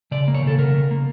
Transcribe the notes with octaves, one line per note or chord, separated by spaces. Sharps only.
C#3 D5
A#3
C#5
C#3 A4
C#3 A#4
C#3
A#3